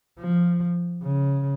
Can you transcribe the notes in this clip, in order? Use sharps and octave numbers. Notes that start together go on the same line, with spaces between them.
F3
C#3